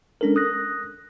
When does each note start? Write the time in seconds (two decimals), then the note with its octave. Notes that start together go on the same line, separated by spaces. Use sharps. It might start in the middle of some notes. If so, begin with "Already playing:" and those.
0.21 G#3 C#4 D4 A4 A#4
0.36 D#6 F#6 A#6